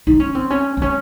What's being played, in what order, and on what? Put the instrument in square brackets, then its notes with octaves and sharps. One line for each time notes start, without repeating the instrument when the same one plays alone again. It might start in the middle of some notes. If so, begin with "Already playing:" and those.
[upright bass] D#4
C#4
C4
C#4
C4
C#4